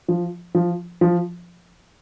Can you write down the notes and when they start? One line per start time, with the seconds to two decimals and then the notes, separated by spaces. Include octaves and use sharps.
0.08 F3
0.55 F3
1.01 F3